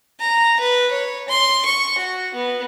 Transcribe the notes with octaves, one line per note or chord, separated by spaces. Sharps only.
A#5
B4
C#5
C6
C#6
F#4
B3